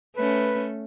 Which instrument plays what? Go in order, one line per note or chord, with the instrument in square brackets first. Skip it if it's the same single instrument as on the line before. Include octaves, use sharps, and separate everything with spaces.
[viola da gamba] A3 C#4 [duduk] B4